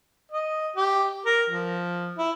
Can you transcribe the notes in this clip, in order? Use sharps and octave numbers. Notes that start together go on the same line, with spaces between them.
D#5
G4
A#4
F3
E4